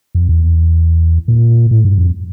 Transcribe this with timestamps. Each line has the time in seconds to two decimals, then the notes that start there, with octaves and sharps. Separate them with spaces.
0.15 F2
0.29 E2
1.28 A#2
1.71 A2
1.85 G2
1.98 F2